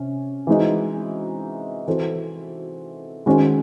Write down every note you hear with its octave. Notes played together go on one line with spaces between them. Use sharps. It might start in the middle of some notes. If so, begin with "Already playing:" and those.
Already playing: C3 C#4
E3 G#3 C4 D#4 F#4
E3 C4 F#4 A4
D#3 G#3 C#4 F#4 C5